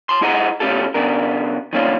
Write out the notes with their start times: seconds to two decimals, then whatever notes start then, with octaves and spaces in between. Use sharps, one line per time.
0.09 A5 C6
0.21 G#2 E4 G#4 D#5 F#5 A#5
0.60 B2 A3 C#4 F4 G4 A4
0.94 C#3 B3 D4 A#4
1.73 D#3 F3 A#3 C#4 D4 F4